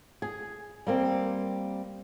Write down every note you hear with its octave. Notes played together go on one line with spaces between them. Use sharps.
G#4
G3 A#3 C4